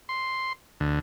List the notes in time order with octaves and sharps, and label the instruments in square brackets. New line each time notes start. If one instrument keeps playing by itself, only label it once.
[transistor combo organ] C6
D2